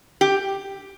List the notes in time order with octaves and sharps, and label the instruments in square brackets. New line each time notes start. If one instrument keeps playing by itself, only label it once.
[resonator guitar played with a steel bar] G4